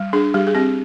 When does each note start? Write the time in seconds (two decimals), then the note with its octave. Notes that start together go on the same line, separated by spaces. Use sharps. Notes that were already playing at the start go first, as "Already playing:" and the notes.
Already playing: G3
0.13 D4 G#4
0.34 G3 G4
0.47 G#4
0.55 C4 G4